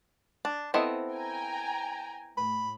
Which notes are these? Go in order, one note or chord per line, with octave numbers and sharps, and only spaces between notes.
D4
B3 C4 E4 A4 D#5
G5 G#5 A#5
A2 B5